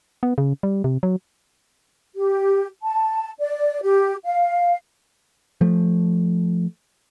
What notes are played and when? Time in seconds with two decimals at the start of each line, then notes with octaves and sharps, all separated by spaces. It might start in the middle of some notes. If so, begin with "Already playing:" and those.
0.23 B3
0.38 C#3
0.63 G3
0.84 C3
1.03 F#3
2.15 G4
2.82 A5
3.40 D5
3.82 G4
4.24 F5
5.61 F3 A3